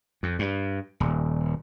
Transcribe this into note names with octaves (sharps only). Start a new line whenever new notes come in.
F2
G2
D#1